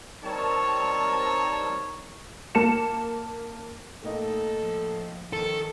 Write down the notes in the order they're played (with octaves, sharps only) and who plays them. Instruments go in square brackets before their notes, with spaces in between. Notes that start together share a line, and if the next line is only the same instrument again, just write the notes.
[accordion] G3 C4 A5 [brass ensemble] D#4 A#4 C#5
[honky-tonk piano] A#3 A5 C#7 E7
[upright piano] A2 A#3 D#4 [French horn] A4
[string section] F3
[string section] D#3 F3 [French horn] D#4 [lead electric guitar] A4